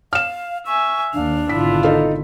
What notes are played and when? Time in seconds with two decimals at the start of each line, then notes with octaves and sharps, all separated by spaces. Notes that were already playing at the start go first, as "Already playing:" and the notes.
0.13 F5 F6 E7
0.66 E5 G#5 C#6
1.13 D#2 D4 F5
1.49 G#1 B2 D3 E4 F4 B6
1.83 D#4 A4 F5